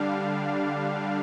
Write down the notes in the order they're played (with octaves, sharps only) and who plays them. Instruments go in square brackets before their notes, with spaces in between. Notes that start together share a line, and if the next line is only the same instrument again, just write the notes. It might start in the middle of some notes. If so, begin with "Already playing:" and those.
Already playing: [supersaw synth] D3 G3 D4 F5